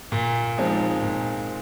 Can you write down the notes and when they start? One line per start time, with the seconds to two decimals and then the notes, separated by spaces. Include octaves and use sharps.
0.12 A#2
0.58 F3 G#3 C4 D#4
1.02 A#2